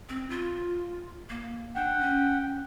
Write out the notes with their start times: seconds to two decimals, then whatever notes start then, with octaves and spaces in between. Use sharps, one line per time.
0.09 C4
0.30 F4
1.29 A#3
1.76 D4 F#5 G5
2.00 C#4